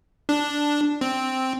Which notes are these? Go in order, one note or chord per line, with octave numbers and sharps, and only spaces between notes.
D4
C4